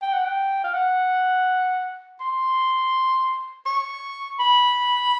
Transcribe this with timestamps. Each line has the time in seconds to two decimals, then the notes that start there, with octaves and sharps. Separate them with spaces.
0.02 G5
0.13 F#5
0.25 G5
0.64 F5
0.74 F#5
2.20 C6
3.66 C#6
4.39 B5